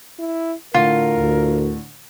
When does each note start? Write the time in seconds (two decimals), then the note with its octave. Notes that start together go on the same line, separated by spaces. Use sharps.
0.19 E4
0.74 A2 D3 F4 A#4
1.18 D2